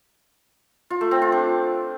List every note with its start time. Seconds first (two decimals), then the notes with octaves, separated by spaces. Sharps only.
0.90 F4
1.01 A3
1.11 C4
1.22 F4
1.32 D4